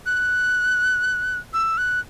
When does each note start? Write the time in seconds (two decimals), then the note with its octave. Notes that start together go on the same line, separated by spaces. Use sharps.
0.06 F#6
1.53 E6
1.78 F#6